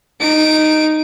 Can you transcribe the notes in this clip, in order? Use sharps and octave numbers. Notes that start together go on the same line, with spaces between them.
D#4 D7